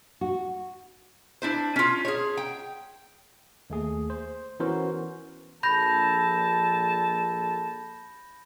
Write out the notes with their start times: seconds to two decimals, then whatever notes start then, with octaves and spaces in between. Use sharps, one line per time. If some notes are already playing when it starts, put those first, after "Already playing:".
0.21 F#4
1.42 D4 E4 C5
1.76 C#4 F4
2.05 G#4 C#5
2.37 G5
3.70 D#2 A3 G#4
4.10 C5
4.60 E3 B3 C#4 F#4 A#4 C5
5.63 A#1 A4 A5 B5 G6 A#6